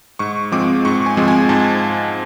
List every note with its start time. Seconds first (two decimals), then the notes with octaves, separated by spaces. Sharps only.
0.19 G#2 C#6
0.52 F3 G#3 C4 D6
0.85 G#2 C#6
1.06 G#5
1.17 F3 G#3 C4
1.28 G#5
1.49 G#2 A5